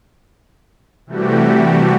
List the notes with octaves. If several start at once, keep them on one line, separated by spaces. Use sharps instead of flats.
C3 E3 G3 A3 F#4 G4